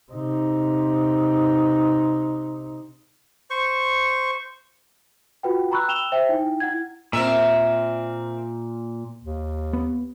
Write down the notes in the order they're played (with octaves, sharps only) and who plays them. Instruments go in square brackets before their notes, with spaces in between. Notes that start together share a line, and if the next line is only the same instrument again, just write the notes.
[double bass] C3 D#4
[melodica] C5 C#6
[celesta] F4 F#4 B4 F#5 G5
A#5 B5 C#6 E6 F#6
G5 E6 E7 F7 G7
C5 E5 G5
D#4 E4 G5
E4 F#5 G#6
[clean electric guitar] A#2 [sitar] C4 A#4 E5
[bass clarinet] D#2
[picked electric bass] B3